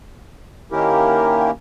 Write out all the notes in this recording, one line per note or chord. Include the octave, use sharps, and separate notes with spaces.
D#3 A#3 C#4 E4 G4 A#4